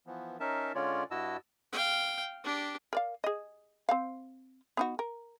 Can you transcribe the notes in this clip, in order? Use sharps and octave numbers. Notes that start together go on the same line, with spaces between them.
E3 F3 B3
C#4 D#4 A#4 E5 A5
D3 G#3 C#4 F4 C#5 D5
G2 E4 F#4 D#5 A5 E6
F5 G5
D4 G4
A#4 D5 F5
G#4 D#5
C4 C5 F5
B3 D#4 F#4
A#4